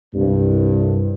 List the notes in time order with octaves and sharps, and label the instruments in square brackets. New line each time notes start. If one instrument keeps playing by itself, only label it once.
[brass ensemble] C2 G2